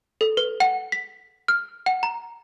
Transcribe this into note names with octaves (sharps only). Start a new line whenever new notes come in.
A4
B4
F#5
B6
F6
F#5
A#5